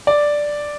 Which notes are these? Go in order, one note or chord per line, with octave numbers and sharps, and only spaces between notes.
D5